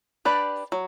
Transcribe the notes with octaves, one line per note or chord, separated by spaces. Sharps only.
D4 G4 B4 D5
F#3